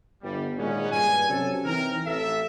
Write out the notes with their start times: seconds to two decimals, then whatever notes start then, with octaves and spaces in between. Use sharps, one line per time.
0.22 G1 G3
0.57 A#2 D#3 G#3 A#3 B3 C#4
0.91 G2 G#5
1.29 C3 F#3 C#4 A4
1.65 E3 C4 D#4 A#4
2.05 A1 A4 E5